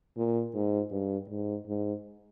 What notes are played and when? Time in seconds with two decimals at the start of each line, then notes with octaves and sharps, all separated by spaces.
0.17 A#2
0.54 G#2
0.91 G2
1.29 G#2
1.67 G#2